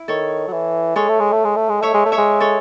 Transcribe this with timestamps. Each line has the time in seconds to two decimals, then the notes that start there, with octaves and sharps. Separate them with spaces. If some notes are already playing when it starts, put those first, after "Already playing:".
Already playing: E4
0.08 D#3 A4 C#5
0.48 F#3
0.53 E3
0.96 G#3 A4 C#5
1.09 A3
1.20 G#3
1.32 A3
1.45 G#3
1.57 A3
1.69 G#3
1.81 A3 C#5 E5
1.94 G#3
2.06 A3
2.12 C#5 E5
2.18 G#3
2.40 A4 C#5